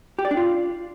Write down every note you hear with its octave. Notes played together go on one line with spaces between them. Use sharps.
G4
D5
D4
F4